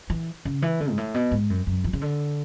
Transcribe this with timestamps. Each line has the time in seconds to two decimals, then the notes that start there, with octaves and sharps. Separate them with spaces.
0.10 E3
0.45 C#3
0.62 E3
0.80 D3
0.90 G#2
0.98 A2
1.14 B2
1.31 G#2
1.50 F#2
1.67 F#2
1.84 E3
1.93 C#3
2.01 D3